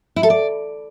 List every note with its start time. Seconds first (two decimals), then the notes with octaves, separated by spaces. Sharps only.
0.16 E4
0.23 A4
0.30 D5